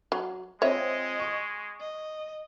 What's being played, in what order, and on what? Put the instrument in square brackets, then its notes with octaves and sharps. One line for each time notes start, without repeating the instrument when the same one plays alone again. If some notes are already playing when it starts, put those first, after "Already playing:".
[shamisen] F#3
[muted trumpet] G#3 [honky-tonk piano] C4 F4 [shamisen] C#5 E5 [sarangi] D#5
[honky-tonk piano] C#6
[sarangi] D#5